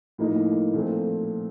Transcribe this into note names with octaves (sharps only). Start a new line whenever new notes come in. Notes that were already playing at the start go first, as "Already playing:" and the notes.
A2 F3 A#3 D#4
A#2 F3 A3 C4